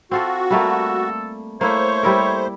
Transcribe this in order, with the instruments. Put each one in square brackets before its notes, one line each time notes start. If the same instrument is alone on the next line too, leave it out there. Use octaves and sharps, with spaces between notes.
[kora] C4 F4 A4 [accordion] F#4
[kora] G3 A3 A#3 [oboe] A4
[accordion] A3 C5 [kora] A#3 E4 [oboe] C#5
[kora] G3 E4 A#4